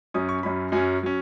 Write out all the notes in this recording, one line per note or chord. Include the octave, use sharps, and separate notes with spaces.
F#2 F#3 C#4 D#6
C#6
F#2 F#3 C#4 B5
F#2 F#3 C#4 G#5
F#3 C#4